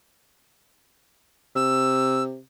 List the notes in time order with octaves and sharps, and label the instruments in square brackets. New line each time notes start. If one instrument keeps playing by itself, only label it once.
[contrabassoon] C3 [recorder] E6